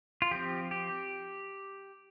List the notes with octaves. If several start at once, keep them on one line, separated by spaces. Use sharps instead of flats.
F4
F3 C4 G4
G4